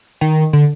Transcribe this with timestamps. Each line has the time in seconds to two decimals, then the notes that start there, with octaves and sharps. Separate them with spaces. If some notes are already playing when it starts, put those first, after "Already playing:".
0.21 D#3
0.53 D3